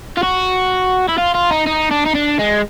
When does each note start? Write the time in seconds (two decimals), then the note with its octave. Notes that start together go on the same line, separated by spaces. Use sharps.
0.17 F4
0.23 F#4
1.09 E4
1.18 F4
1.35 F4
1.51 D#4
1.66 D#4
1.91 D4
2.05 D#4
2.15 D4
2.39 G#3